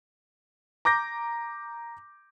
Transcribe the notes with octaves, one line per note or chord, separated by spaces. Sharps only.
A#5 D6 G6 A#6